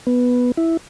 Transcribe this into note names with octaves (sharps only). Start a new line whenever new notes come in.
B3
E4